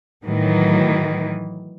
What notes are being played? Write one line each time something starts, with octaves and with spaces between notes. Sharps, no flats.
A2 D#3 E3 F#3